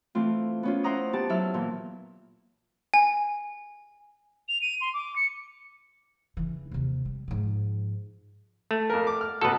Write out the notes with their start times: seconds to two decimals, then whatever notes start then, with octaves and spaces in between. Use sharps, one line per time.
0.15 E3 A3 C4 F4
0.63 B3 C#4 F4
0.84 E4 C5 F#5 A#5 D#6
1.13 B3 G4 A5
1.29 F#3 E4 E5 F6
1.54 A#2 E3
2.94 G#5
4.49 F7
4.62 D#7
4.81 C6
4.94 D6
5.16 C#7
6.37 C#3 E3
6.71 D#2 C3
7.05 G3
7.28 G#2 F3
8.71 A3
8.90 F2 A#4
9.07 D6
9.21 F6
9.41 A1 B2 F#4 A4 B4